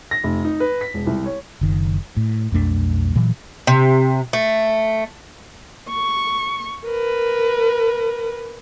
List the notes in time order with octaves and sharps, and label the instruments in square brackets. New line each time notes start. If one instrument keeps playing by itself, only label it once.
[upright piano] A#6
F1
D#4
B4
B6
E1
C2
C#5
[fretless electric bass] F#1 D#3
A2
B1 F2 A3 D4
A#2 E3 F#3
[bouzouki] C3
A3
[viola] C#6
A#4 B4